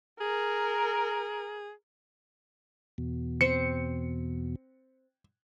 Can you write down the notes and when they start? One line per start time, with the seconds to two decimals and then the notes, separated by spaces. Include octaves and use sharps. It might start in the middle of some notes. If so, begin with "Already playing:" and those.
0.21 G#4 A#4
2.98 E2 B2
3.41 C4 C5 C#7